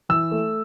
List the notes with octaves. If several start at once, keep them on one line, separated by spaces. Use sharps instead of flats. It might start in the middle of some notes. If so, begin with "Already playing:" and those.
E3 E6
A3